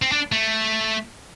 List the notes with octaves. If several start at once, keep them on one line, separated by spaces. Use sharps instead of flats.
C4
D4
A3